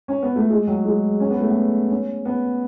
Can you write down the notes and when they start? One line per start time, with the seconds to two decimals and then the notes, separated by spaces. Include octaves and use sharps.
0.08 C#4
0.22 B3
0.36 A3
0.50 G#3
0.67 F#3
0.85 G#3
1.20 C#4
1.30 B3
1.40 A3
1.50 B3
1.90 C#4
2.25 B3